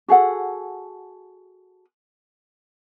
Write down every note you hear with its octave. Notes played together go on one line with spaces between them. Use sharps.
F#4 G#4 A4 F#5